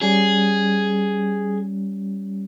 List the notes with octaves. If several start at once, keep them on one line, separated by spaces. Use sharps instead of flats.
G3 C#4 G#4